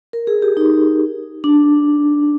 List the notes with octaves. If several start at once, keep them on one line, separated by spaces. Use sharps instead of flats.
A#4
G#4
G4
D#4
D4